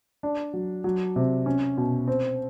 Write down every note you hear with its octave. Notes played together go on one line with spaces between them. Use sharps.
D4
F#3
F#3
C3
C#4
B2
C4